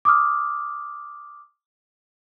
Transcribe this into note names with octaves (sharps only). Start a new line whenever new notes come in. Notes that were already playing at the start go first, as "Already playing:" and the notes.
D6 D#6 F6